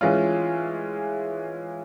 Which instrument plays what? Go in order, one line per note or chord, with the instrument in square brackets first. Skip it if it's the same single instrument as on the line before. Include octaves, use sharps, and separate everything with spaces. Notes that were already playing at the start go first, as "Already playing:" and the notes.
[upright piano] E3 G#3 C#4 F4